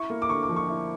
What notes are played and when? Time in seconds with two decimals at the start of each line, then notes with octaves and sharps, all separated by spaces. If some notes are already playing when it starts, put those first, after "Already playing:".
Already playing: E4 C#6
0.10 A#3
0.22 D6
0.29 D3 C#6
0.43 D6
0.49 F3
0.56 C#6
0.69 E4